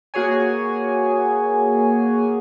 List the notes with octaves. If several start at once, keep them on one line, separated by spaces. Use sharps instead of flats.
A#3 F#4 G#4 C#5 G#5